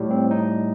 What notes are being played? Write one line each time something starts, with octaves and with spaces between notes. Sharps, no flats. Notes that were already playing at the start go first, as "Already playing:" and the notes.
Already playing: A2 G3
C4
D#4